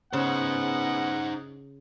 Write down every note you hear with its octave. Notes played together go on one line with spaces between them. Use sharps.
C#3 B3 D#4 C5 F#5